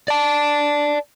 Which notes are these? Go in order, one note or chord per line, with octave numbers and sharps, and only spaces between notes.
D5 A5